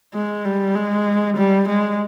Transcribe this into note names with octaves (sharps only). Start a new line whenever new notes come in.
G#3
G3
G#3
G3
G#3